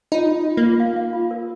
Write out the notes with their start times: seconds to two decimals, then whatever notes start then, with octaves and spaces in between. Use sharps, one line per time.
0.12 D#4 F4
0.29 F4
0.46 F4
0.57 A#3
0.63 F4
0.80 F5
0.96 F5
1.13 F4
1.31 A#4